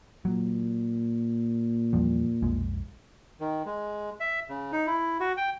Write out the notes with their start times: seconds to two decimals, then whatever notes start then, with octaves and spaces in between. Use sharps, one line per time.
0.25 A#2 F#3
1.93 E2 F3 G3
2.42 B1 F2 G#3
3.40 D#3
3.66 G#3
4.20 E5
4.49 C#3
4.72 D#4
4.87 E4
5.20 F#4
5.37 G5